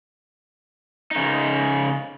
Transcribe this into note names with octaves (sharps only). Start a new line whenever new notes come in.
C#3 D#4